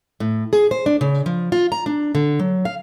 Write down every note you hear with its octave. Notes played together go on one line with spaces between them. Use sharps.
A2
G#4
C5
D4
C#3
F3
F4
A#5
D4
D3
F#3
F5